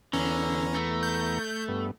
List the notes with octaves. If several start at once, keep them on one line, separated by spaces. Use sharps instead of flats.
E2 D3 B3 C#4 A#5
A3
G6
G2 B3